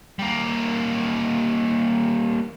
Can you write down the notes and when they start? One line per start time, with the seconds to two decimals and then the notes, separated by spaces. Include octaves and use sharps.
0.19 G3 A#3